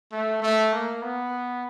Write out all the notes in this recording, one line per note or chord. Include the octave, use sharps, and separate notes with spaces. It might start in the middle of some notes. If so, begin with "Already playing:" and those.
A3
A3
A#3
B3